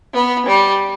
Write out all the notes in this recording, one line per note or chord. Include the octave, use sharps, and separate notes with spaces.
B3
G3